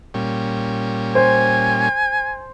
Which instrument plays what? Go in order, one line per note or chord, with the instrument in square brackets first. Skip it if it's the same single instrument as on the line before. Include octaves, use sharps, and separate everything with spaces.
[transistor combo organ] A#2 G3 C#4
[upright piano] C5 [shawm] G#5